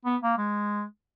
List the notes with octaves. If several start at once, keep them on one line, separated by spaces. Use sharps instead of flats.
B3
A#3
G#3